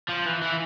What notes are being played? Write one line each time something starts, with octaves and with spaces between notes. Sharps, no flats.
F3
E3
E3